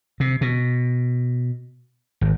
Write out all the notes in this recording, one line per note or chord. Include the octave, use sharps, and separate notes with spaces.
C3
B2
G#1